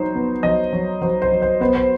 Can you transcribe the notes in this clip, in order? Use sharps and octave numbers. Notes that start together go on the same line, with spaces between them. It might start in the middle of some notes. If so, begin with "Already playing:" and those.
Already playing: F#3 D#4 C5
B3
F#3 D#5
F#3
F#3 C5
C5
F#3
C5
B3 C5
C5